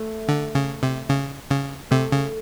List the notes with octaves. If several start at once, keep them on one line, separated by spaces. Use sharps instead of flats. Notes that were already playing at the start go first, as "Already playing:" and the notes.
Already playing: A3
D3
C#3
C3
C#3
C#3
C3 A3
C#3